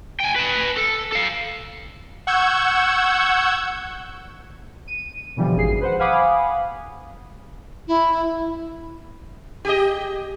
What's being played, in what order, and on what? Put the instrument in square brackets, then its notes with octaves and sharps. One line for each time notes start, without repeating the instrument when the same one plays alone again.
[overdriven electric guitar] G5 G#5
B4 A5
A4
A4 F5
[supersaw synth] F#5 C#6 E6 G6 G#6
[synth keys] D#7
B2 D3 E3 F3 G3
G#1 F#2 G#4 C7
B4 C5 F#5
F5 F#5 G#5 B5 D6 D#6
[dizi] E4
[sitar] G4 G#4 D#5